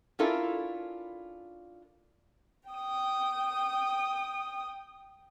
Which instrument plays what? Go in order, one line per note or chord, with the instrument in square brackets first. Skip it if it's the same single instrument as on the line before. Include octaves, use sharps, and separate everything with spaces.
[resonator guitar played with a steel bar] C#4 D4 E4 F4 A4 A#4
[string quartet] G5 D#6